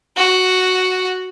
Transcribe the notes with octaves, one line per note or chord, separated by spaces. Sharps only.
F#4